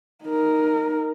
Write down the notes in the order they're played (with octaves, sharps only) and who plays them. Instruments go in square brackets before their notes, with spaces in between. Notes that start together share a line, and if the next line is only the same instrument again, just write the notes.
[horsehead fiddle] D#4 A#4